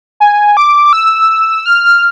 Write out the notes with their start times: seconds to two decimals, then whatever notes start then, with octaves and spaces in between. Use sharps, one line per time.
0.20 G#5
0.57 D6
0.93 E6
1.66 F6